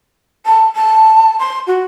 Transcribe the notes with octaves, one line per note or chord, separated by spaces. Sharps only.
A5
A5
C6
F#4